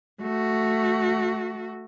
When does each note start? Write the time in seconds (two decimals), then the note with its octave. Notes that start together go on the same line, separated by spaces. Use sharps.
0.22 A3 F#4